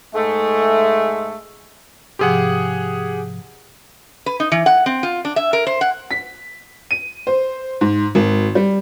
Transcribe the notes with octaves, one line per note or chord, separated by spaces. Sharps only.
G#2 G#3 A3
G#2 C3 F3 G4 G#4 F#5
B4
D#4
E3
F#5
C4
F4
D4
E5
A#4
C5
F#5
B6
D#7
C5
G#2
G#1
G3